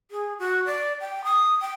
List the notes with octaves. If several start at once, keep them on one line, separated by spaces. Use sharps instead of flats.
G#4
F#4
D5
G5
D#6
G5